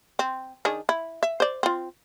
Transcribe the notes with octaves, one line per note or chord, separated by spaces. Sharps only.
C4
D#3 D4 G#4
E4
E5
C5 D5
C4 F4